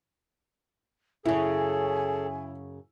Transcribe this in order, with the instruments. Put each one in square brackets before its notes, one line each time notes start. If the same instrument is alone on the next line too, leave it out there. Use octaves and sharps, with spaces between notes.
[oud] F#2 C#3 [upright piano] E4 [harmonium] G#4 A4 [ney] G#5